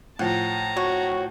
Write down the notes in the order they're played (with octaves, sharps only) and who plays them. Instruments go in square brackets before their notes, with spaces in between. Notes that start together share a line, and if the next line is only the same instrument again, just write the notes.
[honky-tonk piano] A2 F3 [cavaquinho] F#5 [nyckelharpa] A5 A#5
[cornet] F#4 [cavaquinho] C#5